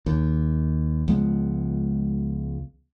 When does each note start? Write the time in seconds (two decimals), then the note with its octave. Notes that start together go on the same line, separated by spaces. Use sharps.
0.06 D#2
1.08 C#2 F3 G#3 B3